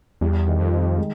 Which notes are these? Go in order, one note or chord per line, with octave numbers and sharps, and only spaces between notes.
E2 G3
D#3
F2
D#3
G#3